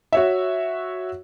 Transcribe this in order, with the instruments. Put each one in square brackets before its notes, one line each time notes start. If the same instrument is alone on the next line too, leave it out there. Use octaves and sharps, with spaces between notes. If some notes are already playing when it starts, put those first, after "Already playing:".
[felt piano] F#4 C#5 E5